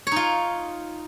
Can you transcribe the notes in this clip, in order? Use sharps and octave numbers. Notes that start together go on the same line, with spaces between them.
D#4 F4 C#5